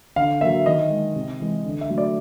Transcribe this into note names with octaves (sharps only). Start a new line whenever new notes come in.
D3 F5
F#3 A#3 E5
D#3 D#5
G#3
C3
E3 G#3
D3
E5
F#3 A3
D5